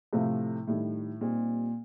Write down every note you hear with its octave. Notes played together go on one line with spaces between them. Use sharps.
A2 C3 F3 A3
A2 D#3 G3 D4
A#2 G3 C4 D#4 G4